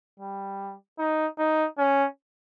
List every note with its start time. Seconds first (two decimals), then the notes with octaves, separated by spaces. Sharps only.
0.20 G3
0.99 D#4
1.39 D#4
1.78 C#4